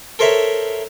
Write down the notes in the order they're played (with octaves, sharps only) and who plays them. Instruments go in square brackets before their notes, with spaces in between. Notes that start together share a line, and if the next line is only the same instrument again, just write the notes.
[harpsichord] A4 A#4 C5 C#5 E5